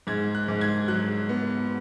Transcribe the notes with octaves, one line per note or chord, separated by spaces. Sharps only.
G#2 G#6
F#6
G#2
G#6
F#3 F#6
B3